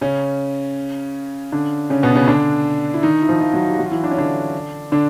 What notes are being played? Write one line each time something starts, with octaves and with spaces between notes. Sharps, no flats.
C#3 C#4
D3 D4
C#3 C#4
B2 B3
C#3 C#4
D3 D4
E4
D#3 D#4
E4
F3 F4
F3 F4
F#3 F#4
G4
F#3 F#4
F4
E3 E4
D4
C#4
D3 D4
D3 D4